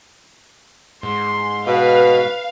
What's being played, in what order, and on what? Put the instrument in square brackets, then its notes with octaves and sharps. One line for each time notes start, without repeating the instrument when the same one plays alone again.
[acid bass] G#2 [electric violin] C6
[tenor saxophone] B2 [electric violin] B4 [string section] F5